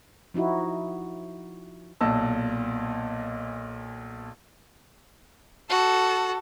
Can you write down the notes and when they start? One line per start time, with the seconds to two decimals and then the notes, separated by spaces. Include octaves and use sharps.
0.34 F3 D#4 E4 F#4
2.01 B1 A#2 D#5 A5 E6
5.70 F#4 A4